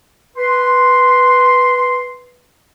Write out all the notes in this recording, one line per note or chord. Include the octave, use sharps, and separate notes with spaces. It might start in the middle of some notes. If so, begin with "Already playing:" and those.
B4 C6